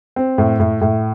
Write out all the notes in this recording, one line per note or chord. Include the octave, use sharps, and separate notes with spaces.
C4
A2
A2
A2